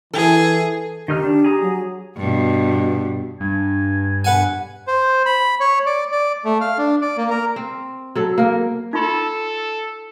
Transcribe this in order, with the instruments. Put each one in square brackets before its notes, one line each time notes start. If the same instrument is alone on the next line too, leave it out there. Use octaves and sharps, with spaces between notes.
[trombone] E3 [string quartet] G#4 [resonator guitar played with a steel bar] A4
[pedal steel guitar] D#3 D#4 F6 [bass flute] G4
[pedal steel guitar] D4
G#4 A#5 D#6
[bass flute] F#3
[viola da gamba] G2 B2
[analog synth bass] G2 [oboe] G#5
[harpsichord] B4 F#5 G#5
[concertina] C5
B5
C#5
D5
D5
A3
F5
D4
D5
A#3
A#4
[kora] C4
F#3 A4
A#3 A#4
[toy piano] D#4 F4 C6 [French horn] A4